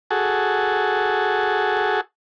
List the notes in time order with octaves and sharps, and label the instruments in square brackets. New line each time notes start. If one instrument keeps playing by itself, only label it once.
[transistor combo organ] F#4 G#4 A4